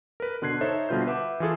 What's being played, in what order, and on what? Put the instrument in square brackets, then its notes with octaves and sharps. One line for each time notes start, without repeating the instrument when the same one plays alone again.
[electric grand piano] A#4 B4
B2 D3 C6 F#6 G#6 C7
D#4 A4 C5 C#5 E5
B2 D3 G3 F4 B4 G6
B4 E5 F#5 D6
E3 F4 G#4 A4